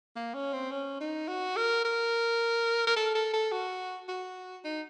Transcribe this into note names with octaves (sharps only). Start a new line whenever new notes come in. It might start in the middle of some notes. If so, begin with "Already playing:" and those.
A#3
C#4
C4
C#4
D#4
F#4
A#4
A#4
A#4
A4
A4
A4
F#4
F#4
D#4